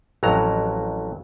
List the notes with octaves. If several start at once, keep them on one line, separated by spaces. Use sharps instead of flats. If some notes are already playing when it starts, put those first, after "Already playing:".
A1 F2 F#3 A#5